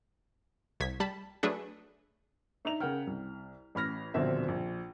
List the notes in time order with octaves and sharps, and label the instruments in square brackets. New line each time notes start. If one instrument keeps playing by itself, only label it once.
[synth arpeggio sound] C2 G#6 B6
G3 A5 B5
F#3 A3 D4 G#4 B4
[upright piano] D4 D#4 D5 E5 A#5 F7
C#3 A#4 F#5 G5 F6
C2
A1 B5 F6 A#6
D#1 A#1 B2 D3 C4 E5
A#1